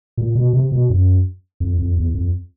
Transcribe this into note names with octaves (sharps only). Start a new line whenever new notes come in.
A#2
B2
C3
B2
F#2
F2
F2
E2
F2